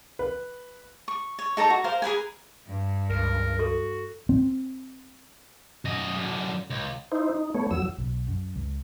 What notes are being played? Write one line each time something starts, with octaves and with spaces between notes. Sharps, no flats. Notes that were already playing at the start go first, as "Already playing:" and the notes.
B4
C#6
C#5
D#4 A4 C#5 A#5
F#4
A#4 C5 F5
G#4 A#4 B4 G#5
G2
C#2 A#4
F#4 A4
C4
F#2 D#5
F#2 D3
C#2
D#4 E4 C5
D#4
A3 B3 C#5
E2 F#3 E6
B1
F#2
C#2